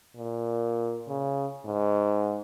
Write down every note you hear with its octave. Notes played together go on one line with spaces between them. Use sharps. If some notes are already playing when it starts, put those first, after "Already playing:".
A#2
C#3
G#2